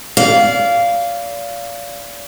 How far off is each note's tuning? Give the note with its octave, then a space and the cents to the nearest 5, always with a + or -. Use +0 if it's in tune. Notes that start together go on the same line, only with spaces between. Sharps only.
D5 -35 F5 -10